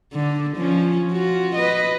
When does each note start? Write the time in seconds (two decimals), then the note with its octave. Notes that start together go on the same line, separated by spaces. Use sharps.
0.13 D3
0.57 F3 C#4
1.11 F4 F#4
1.55 B4 D#5